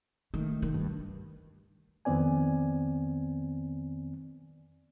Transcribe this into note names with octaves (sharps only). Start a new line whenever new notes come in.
D#3 A3
D#3
G2
F2 D#3 B3 C4 D5 G#5